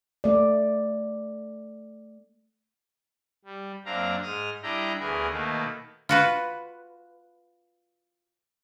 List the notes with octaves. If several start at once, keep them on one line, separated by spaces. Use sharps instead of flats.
A3 D5
G3
F#2 A#3 C4 D4 F5 A#5
G#2 D#6 F6
G3 D4 E4 D#5 G5 A#5
D2 E3 B3 G#4 A#4
B2 D#3 A3 A#3
F4 F#4 B4